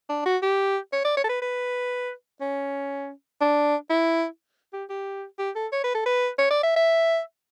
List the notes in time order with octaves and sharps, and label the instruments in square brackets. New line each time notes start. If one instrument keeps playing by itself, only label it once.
[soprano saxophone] D4
F#4
G4
C#5
D5
C#5
A4
B4
B4
C#4
D4
E4
G4
G4
G4
A4
C#5
B4
A4
B4
C#5
D5
E5
E5